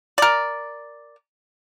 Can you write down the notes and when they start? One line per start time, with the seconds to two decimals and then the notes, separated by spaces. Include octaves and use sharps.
0.18 A#4 D5